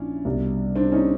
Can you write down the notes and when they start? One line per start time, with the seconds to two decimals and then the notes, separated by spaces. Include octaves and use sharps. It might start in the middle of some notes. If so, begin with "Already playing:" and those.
Already playing: A#1 A#2 C#4 D4 E4
0.25 C2 B2
0.76 C4 D4
0.92 C#4 D#4